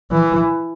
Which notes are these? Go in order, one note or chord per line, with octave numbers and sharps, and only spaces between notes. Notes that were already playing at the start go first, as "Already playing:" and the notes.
E3